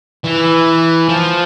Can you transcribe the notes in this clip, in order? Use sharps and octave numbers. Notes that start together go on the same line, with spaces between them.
E3
F3